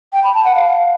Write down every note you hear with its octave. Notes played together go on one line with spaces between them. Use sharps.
G5
B5
A5
F#5
F5